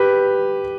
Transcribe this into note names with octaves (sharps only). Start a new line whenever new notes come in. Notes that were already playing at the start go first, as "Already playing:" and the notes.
Already playing: G4 B4